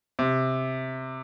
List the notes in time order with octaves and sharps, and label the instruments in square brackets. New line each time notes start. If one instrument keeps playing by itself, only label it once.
[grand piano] C3